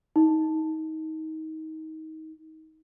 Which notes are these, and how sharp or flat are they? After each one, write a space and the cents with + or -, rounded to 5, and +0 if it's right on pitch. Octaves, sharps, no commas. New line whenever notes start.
D#4 +25